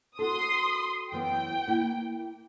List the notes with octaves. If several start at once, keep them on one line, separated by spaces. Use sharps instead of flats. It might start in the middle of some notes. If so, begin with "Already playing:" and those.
F#4 A4 C6 D#6
F#2 E3 B3 G5
A#3 E4